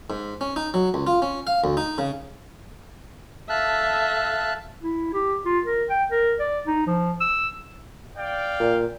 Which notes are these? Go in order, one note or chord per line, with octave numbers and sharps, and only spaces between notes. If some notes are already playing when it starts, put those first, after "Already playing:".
G#2
C#4
D#4
F#3
C#2
F4
C#4
F5
D2
D#4
C#3
A4 E5 F5 A5 F#6
E4
G4
F4
A#4
G5
A#4
D5
D#4
F3
E6
D5 F5 G5
A#2